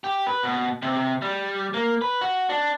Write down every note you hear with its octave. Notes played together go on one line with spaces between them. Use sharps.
G4
B4
B2
C3
G3
A#3
B4
F#4
D4